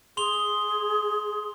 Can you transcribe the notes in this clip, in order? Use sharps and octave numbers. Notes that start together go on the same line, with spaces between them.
G#4 C6 F7 G7